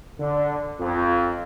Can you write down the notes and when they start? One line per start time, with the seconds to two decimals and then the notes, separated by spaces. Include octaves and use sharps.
0.19 D3
0.79 F2